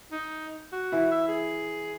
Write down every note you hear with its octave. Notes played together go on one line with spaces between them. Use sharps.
D#4
F#4
E3 E4
E5
G#4